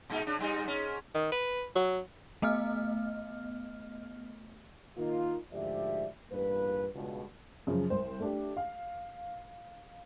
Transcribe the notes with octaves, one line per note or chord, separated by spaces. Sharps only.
A#2 G#3 D#4
C#3 D4
G#2 G3 D#4
G#2 C#4
D#3
B4
F#3
A3 B3 D#5 F6
D#3 A#3 D#4 F4
D2 G#2 F3 G4 D5 E5
A1 G2 A#2 A#3 B4
C#2 G2 B2
F#2 C#3 F3
C2 C5
A3 D4 G4
F5